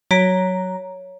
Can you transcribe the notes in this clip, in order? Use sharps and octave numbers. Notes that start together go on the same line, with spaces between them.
F#3 C#5 A#5 B6 D7